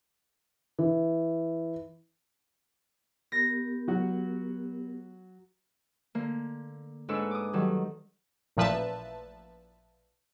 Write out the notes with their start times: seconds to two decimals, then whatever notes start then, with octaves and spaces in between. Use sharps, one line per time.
0.79 E3
3.32 B3 G4 A#4 A#6
3.88 F#3 F#4
6.15 D3 A#3
7.08 G#2 D4 A4 B4 C#5 E6
7.31 D6 D#6
7.53 D#3 F#3 G3 A4
8.57 A1 A#2 F3 B4 E5 A5